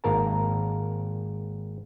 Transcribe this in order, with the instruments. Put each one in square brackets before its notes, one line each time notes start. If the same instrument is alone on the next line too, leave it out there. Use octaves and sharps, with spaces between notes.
[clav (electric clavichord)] G#1 A#3 A#4 A5